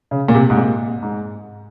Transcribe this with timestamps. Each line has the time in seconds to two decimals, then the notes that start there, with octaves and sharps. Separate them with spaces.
0.11 C#3
0.28 A#2
0.35 C3
0.50 G#2
0.57 A#2
1.03 G#2